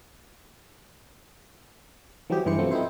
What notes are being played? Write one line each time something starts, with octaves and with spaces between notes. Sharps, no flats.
E3 F#3 G3 C4 G4 G#4
G2 E3 G#3 C5 C#7
C3 F3 F#3 A3 B3 C4
C4 D#4 E4 C5